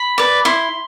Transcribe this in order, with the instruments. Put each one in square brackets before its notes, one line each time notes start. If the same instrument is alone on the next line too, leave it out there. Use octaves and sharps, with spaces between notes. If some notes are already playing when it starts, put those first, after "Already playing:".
Already playing: [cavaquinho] B5
B4 D5
E4 C6